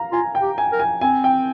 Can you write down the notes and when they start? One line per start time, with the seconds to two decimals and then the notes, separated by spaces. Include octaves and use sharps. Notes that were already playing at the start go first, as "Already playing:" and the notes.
Already playing: F5 A#5
0.12 F4 G#5
0.35 G5
0.42 G4
0.58 G#5
0.72 A#4
0.80 G#5
1.01 C4 G#5
1.24 G5